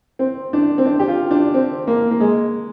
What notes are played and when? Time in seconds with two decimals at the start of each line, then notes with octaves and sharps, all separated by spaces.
0.19 C4
0.53 D4
0.78 C4
0.86 D4
0.99 G4
1.08 F4
1.31 D4
1.54 C4
1.87 A#3
2.11 A#3
2.20 G#3